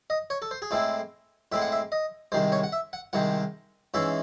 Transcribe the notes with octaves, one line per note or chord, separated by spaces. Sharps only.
D#5
C#5
A4
C5
G#4
A2 G#3 C4 E4 A4
A2 G#3 C4 E4 E5
F#5
E5
D#5
C2 C3 D#3 G#3 C5
C#5
F#5
E5
F#5
C2 C3 D#3 G#3 F#5
G#2 E3 G#3 C#4 E5